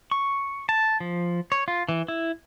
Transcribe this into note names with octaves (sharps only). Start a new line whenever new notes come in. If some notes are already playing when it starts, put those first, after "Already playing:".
C#6
A5
F3
C#5
F4
E3
E4